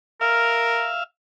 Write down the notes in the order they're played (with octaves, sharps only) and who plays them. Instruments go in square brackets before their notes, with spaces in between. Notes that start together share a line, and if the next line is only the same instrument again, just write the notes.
[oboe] A#4 [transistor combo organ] E5 F5